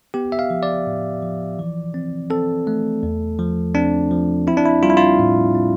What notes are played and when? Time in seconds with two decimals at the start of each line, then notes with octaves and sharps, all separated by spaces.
0.14 B3 G4
0.32 E5
0.39 F5
0.50 F3
0.63 D5
0.87 A2
1.22 F3
1.59 E3
1.94 C4
2.30 C4 A4
2.67 A3
3.03 E2
3.39 F3
3.74 C4 D4
4.11 F3
4.47 C4 E4
4.57 D4
4.66 E4
4.83 G3 F4
4.90 E4
4.97 F4
5.19 A2
5.55 C4